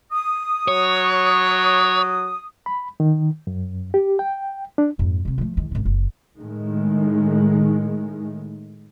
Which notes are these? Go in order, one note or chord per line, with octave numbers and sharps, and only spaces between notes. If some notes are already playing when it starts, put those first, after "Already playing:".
D#6
F#3 C#5
B5
D#3
F#2
G4
G5
D4
F2 G#2
C3 C4
F3 A3
E2 D#3
G#1 C#3
F#1
A2 D#3 G#3